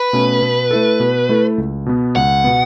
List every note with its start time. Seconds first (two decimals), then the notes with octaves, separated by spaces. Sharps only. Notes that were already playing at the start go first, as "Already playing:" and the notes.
Already playing: B4
0.13 B2 A3 C#4
0.42 B2
0.71 A3 E4 A4
1.00 B2
1.29 A3 E4 A4
1.58 C#2
1.86 B2 B3
2.16 C#2 F#5
2.44 B2 B3